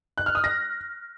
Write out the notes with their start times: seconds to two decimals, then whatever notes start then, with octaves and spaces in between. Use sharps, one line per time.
0.18 F#6
0.26 F6
0.35 D#6
0.44 A#6